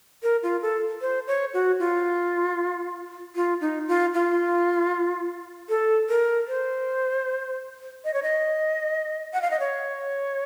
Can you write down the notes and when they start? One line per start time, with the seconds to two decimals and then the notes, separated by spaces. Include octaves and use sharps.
0.23 A#4
0.43 F4
0.62 A4
1.01 C5
1.27 C#5
1.54 F#4
1.79 F4
3.36 F4
3.61 D#4
3.88 F4
4.14 F4
5.69 A4
6.09 A#4
6.48 C5
8.05 D#5
8.14 C#5
8.23 D#5
9.33 F#5
9.42 F5
9.51 D#5
9.60 C#5